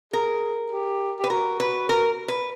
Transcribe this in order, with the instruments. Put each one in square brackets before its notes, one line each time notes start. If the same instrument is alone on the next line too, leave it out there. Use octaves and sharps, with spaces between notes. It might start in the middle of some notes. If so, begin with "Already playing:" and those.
[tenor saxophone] G#4 [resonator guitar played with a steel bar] A#4
[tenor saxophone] G4
[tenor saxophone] G4 [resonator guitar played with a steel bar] B4
[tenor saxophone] F#4 [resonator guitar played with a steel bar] A#4
[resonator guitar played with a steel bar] B4
A#4
B4